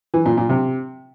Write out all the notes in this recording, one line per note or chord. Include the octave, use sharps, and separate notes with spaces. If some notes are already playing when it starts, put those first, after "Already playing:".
E3
A#2
A#2
C3